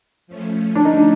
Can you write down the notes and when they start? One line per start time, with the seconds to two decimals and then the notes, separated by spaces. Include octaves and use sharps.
0.27 F3 A3 C#4
0.75 D4
0.85 D#4